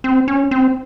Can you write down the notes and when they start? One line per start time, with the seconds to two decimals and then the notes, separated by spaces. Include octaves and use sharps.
0.04 C4
0.28 C#4
0.51 C4